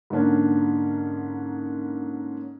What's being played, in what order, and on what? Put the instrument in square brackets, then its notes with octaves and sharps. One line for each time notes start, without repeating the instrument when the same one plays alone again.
[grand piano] G#2 D3 A#3 C#4 D4